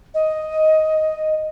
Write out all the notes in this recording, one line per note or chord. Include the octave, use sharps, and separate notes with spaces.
D#5